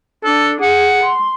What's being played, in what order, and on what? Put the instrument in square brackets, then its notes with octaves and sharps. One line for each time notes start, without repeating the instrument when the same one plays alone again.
[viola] D4 [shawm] A4
[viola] G#4 [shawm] F#5
[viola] C6